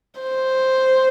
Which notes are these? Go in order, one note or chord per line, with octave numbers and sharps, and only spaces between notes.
C5